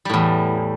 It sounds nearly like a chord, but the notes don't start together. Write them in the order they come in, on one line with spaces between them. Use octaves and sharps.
G3 A2 E2